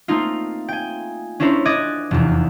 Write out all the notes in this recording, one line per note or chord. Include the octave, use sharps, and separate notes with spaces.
A3 A#3 C4 D#4 F4
G5 G#5
C#4 D4 E4 A#4 C5 C#5
D#5 D6 F#6 G#6 A6
F1 E2